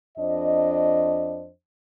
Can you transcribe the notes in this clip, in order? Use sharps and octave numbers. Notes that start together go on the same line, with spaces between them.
F2 D4 C5 D#5